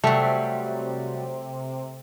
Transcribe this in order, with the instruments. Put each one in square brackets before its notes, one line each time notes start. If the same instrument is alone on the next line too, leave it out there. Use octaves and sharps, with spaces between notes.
[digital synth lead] C3 [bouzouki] F#3 G3 [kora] A3